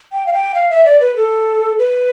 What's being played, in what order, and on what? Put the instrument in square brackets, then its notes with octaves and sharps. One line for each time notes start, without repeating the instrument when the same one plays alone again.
[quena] G5
F5
G5
F5
E5
D5
B4
A4
B4